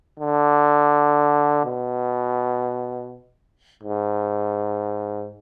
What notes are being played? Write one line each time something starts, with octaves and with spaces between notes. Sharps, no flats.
D3
B2
G#2